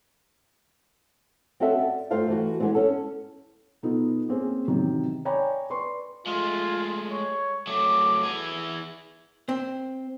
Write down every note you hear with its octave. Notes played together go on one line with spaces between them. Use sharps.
C4 C#4 F#4 A4 E5
D5
G2 A3 F4 C5 F5 A5
E3 A3 F#4
D3 E3 G#3 B3 C4
C#4 A4
B2 B3 D#4 F4 A4
A#3 C4 C#4 G#4
A1 C3 D#3 F#3
C#5 D5 G5 G#5 A#5 B5
B4 D5 C6 C#6
G#3 A3 F4
C#5
F#3 A3 D6
E3 E4 G#4
C4